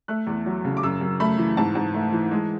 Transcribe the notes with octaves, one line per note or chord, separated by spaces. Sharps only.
A3 F#6
E2
F#3
C#3
D6
F#2 E6
F#2
A3 B5
E3
G#2 A5
G#2
A3
E3
G#3